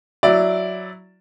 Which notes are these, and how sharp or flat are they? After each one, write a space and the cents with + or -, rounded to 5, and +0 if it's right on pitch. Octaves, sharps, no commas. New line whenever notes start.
F#3 +0 E4 +0 D5 +0